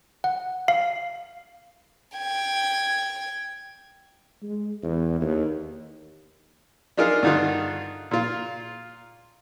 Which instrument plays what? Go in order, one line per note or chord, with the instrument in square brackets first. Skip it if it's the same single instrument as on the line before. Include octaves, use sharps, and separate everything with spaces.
[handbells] F#5
F5
[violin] G5 G#6
[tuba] G#3
E2
D#2
[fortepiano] D4 D#4 F4 G#4 A#4
G2 D3 D#3 D#4 F4
A#2 F4